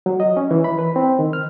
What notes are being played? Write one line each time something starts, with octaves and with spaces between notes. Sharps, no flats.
F#3
D#5
C#4
E3
B5
B4
C4
D#3
F6